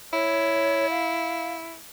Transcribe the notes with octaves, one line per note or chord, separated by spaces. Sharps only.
E4 C#5
F5